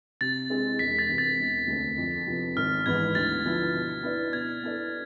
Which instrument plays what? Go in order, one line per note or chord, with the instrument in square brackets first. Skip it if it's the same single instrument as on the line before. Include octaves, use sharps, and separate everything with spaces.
[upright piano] C3 [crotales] A6
[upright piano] G#3 C4 G#4
[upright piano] E1 [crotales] B6
[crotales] A6
[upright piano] E2 C3
[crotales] A6
[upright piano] E1
D2 D3 A3 C4
F2
C3 F3 B3
[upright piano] G#1 [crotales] F6
[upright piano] G#2 E3 B3 [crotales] G#6
[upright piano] D2 [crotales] A6
[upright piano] D3 F3 B3 E4
B2
B3 E4 B4 D5
[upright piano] B2 [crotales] G#6
[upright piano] B3 E4 A4 D5